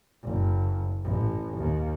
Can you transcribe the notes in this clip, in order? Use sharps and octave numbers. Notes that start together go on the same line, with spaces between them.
F#1
A1
D#2